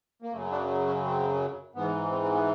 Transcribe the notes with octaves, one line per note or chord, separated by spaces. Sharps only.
A#3
F#2 C#3 F#3 A3
D4
C#4
C4
G#2 E3 B3
C4
C4
B3